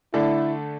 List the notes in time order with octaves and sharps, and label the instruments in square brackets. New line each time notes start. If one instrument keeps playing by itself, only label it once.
[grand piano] D3 A3 D4 A4 [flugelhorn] E4